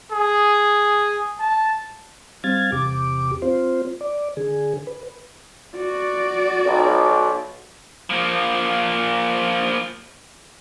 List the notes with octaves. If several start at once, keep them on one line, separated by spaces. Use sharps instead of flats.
G#4
A5
G3 C4 F5 G#6 A6
E2 C3 G4 D6
C4 F4 C5
D5
D3 G#4
B4
F#4 D5
B1
F3 A#3